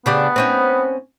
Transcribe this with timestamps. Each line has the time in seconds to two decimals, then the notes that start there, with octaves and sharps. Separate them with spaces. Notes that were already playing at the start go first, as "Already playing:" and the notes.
0.06 C#3 B3 D4 G4
0.36 C4 C#4 D#4